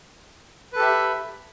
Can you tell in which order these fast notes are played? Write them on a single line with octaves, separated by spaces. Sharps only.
B4 A4 G4 E5 B5